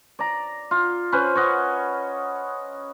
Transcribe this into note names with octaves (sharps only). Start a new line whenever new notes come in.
D5 A#5
F4
C#4 B4 C5
C#5 D#5 F#5